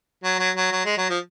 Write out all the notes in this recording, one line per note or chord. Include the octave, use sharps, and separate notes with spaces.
F#3
F#3
F#3
F#3
G#3
F#3
F3